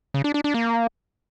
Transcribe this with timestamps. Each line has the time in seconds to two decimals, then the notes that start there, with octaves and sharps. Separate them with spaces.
0.14 C#3
0.24 D4
0.34 D4
0.44 D4
0.54 A#3